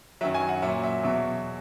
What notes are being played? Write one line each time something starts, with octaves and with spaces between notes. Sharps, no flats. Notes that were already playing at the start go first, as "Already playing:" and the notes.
F#2 D#3 F#3 E5
G#5
F#5
A#2 F#3 E5
E5
E2 B2 F#3 E5